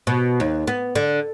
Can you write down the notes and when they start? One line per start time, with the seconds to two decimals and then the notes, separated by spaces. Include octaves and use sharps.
0.07 B2
0.40 D#2
0.67 B3
0.95 D3